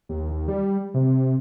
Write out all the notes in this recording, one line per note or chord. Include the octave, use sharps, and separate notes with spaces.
D#2
D#2
G3
C3